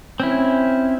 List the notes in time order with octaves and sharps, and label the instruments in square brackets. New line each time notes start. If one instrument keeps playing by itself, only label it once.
[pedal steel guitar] C4 C#4 E4